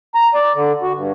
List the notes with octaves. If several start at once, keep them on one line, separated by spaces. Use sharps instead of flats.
A#5
D5
D3
F#4
G2